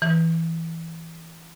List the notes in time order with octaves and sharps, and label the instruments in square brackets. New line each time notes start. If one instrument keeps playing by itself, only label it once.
[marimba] E3